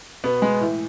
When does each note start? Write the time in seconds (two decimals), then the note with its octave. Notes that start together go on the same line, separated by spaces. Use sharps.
0.24 B2 B3
0.42 G#3
0.61 A2 E3